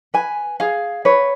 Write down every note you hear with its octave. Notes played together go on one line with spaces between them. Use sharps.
B4 G#5
G#4 F5
B4 C#5